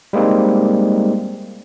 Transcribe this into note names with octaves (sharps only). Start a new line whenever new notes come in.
G3 G#3 A#3 C4 D#4